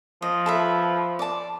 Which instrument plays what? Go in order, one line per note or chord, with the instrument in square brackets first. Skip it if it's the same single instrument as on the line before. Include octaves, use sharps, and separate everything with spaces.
[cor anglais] F3 [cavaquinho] D#5
[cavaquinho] A4 B4 E5
D5 A5